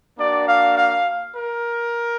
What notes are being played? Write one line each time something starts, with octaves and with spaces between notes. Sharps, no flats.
A#3 D4 F#4 D5
F5
F5
A#4